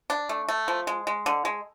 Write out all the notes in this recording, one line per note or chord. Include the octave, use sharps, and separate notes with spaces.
D4
A3
A3
F3
G#3
G#3
D3
G#3